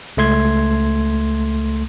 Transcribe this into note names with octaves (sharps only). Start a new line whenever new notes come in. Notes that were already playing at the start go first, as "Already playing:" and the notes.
C#2 A3 C6 G#6